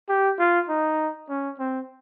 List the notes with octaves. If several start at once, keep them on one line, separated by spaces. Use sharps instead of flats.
G4
F4
D#4
C#4
C4